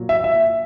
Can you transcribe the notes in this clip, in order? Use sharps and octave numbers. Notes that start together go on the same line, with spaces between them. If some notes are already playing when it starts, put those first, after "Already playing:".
Already playing: A#2 F#3
E5
E5